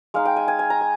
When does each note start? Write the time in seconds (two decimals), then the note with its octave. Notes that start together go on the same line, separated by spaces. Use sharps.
0.14 G#3 D#4 F5
0.25 G5
0.36 G#5
0.48 G#5
0.59 G#5
0.70 A#5
0.81 G#5